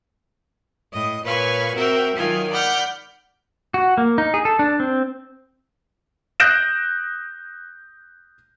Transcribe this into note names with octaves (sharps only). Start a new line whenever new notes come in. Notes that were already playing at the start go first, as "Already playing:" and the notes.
A2 D#5
A#2 B4 C#5 F5 G#5 C#6
C4 F#4 A#4 E5 G5
D#3 F#3 F4 G#5
D5 F#5 B5 F6 G6
F#4
A#3
D#4
G#4
A4
D4
C4
D#6 F#6 G6 A#6 D7 E7